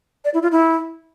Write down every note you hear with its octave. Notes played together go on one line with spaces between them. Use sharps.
D5
E4
F4
E4